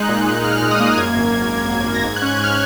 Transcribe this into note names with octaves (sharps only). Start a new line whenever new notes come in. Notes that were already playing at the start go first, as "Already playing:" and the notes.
Already playing: G#3 D#4 F#6
A#2
D#4
A#2 F6
A#2 F6
D#6
A#3 F#6
F#2 G#6
G#1
F#2
G#1
G#1
G#1
A#6
G#2 G#6
F#6
C#4 G#6
F#6
G#2
F6